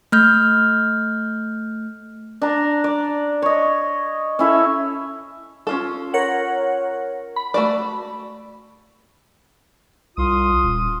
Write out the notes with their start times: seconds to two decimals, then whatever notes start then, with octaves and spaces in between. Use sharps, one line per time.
0.12 A3 F6 G6
2.42 D4 A#5
2.84 D5
3.42 C#5 D#5
4.39 C#4 E4 A4
5.67 C#4 F4 A4
6.14 A#4 C#5 F#5
7.36 B5
7.54 A3 F#4 D5
10.17 C2 F4 C6 D#6
10.63 D#1